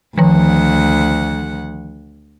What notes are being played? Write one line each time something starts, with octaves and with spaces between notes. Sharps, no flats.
D2 D#3 F3 F#5